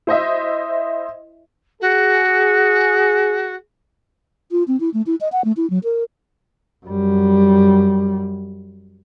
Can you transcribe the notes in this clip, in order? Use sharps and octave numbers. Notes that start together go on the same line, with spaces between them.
E4 C5 D#5 E5
F#4 G#4
F4
C4
E4
A3
E4
D#5
F#5
A3
E4
F#3
A#4
F#2 G3